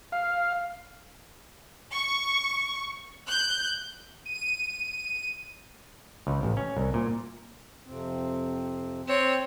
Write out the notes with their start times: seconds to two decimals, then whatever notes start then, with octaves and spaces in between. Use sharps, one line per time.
0.12 F5
1.92 C#6
3.26 F#6 G6
4.25 D#7
6.27 C#2
6.43 A1
6.57 C#4
6.77 C2
6.94 A#2
7.86 F2 C3 C4
9.08 C4 C#5